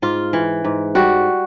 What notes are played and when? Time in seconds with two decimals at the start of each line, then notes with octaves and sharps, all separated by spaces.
0.02 G#2 F4
0.33 E3
0.65 G#2
0.95 G3 F#4